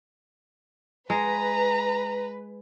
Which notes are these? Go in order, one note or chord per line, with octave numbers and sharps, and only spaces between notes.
G#3 B4 A#5